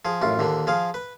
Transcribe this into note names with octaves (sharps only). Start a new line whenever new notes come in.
F3 G#4
A1 F#2 F4
D#2 A#2 D3
F3 G#4 F5
B4